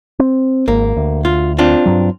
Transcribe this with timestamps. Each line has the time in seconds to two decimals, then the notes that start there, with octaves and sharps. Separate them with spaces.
0.19 C4
0.68 G#1 A#3
0.97 D2
1.25 F4
1.58 C4 D4 F4
1.86 G2 F#3